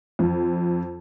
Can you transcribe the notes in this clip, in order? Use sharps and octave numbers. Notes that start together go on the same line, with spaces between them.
F2